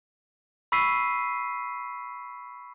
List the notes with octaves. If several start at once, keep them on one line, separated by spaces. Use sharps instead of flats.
B5 C#6 E6 B6 C7 D#7